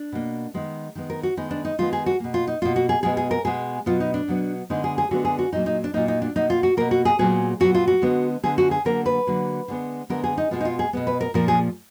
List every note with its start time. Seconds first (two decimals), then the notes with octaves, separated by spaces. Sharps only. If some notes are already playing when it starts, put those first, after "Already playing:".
Already playing: D4
0.12 B2 A#3
0.54 D#3 G#3 B3
0.95 D#3 G#3 B3
1.10 A#4
1.23 F#4
1.37 D#3 G#3 B3 D#4
1.51 D4
1.65 D#4
1.78 D#3 G#3 B3 F4
1.93 G#4
2.06 F#4
2.20 B2 A#3
2.34 F4
2.47 D#4
2.62 B2 A#3 F4
2.76 F#4
2.89 G#4
3.03 B2 G#3 B3 G#4
3.17 G#4
3.31 A#4
3.45 B2 G#3 B3 G#4
3.86 B2 F#3 B3 F4
4.00 D#4
4.14 D4
4.28 B2 F#3 B3
4.70 D3 G#3 B3 D#4
4.84 G#4
4.98 G#4
5.11 D3 G#3 B3 F#4
5.25 G#4
5.39 F#4
5.52 A#2 F#3 A#3 D#4
5.66 D#4
5.84 D4
5.94 A#2 F#3 A#3 D#4
6.08 D#4
6.22 D4
6.36 B2 A#3 D#4
6.50 F4
6.63 F#4
6.77 B2 A#3 A#4
6.91 F#4
7.05 G#4
7.19 A#2 F#3 B3 G#4
7.60 A#2 F#3 B3 F#4
7.74 F4
7.88 F#4
8.02 D3 G#3 B3
8.43 D3 G#3 B3 G#4
8.58 F#4
8.71 G#4
8.85 D3 F#3 A#3 A#4
9.06 B4
9.27 D3 F#3 A#3
9.68 D3 G#3 B3
10.10 D3 G#3 B3 A#4
10.24 G#4
10.37 D#4
10.51 B2 G#3 B3 F4
10.60 D#4
10.65 F4
10.79 G#4
10.93 B2 G#3 B3
11.07 B4
11.21 A#4
11.34 A#2 F3 A#3 A#4
11.48 G#4